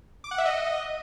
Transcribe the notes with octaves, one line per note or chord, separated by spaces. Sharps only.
D6
F#5
E5
D#5